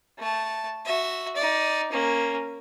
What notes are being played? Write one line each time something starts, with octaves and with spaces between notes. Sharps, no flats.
A3 A5
F#4 E5
D#4 D5
A#3 C#4